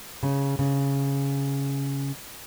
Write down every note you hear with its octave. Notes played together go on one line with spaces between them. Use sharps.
C#3
C#3